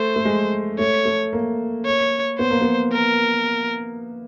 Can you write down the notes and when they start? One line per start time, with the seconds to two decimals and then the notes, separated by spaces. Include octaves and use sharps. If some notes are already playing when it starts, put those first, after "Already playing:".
Already playing: A3 C5
0.16 A3
0.25 G#3
0.79 A3 C#5
1.05 A3
1.33 A#3
1.85 C#5
2.39 B3 C5
2.51 A#3
2.61 B3
2.93 A#4